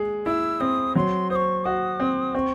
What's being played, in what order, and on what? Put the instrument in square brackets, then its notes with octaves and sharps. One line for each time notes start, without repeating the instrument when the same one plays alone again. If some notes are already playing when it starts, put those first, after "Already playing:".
Already playing: [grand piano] G#3 G#4
[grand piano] E4 [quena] E6
[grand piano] C4 [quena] D#6
[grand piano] F#3 [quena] C6
[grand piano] C5 [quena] D#6
[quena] C#6
[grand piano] F#4 [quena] D#6
[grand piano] C4
[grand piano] C4 [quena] C#6